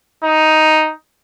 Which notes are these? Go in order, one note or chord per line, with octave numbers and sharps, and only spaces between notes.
D#4